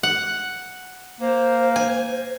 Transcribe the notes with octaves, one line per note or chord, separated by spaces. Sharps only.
F#5
A#3 C5
G#5